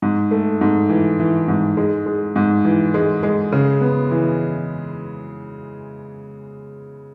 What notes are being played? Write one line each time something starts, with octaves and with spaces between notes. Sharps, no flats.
G#2
A3
G#2
E3
E3
G#2
G#3
G#3
G#2
E3
G#3
G#3
C#3
B3
E3